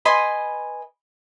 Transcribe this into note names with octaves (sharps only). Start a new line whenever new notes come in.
B4 D#5 G#5 C6